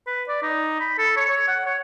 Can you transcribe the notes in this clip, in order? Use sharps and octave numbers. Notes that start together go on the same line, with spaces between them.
B4
D5
D#4
B5
A4
C#5
C#5
F#5
C#5